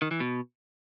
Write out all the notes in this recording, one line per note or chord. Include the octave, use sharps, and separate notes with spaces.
D#3
E3
B2